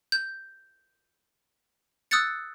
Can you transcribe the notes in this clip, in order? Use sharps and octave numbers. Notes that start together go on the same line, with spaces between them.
G6
D#6 E6 F#6 G6 A6 C#7